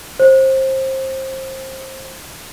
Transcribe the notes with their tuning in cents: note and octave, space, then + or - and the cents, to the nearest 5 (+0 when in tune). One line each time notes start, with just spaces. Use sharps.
C5 +25